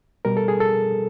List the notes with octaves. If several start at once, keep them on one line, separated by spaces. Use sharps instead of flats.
B2 G3 A#4
A4
G#4
A4